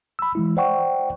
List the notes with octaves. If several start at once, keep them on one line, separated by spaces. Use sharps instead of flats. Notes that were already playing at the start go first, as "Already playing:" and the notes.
B5 E6
E3 G#3 E4
C5 D5 F#5 G5 C#6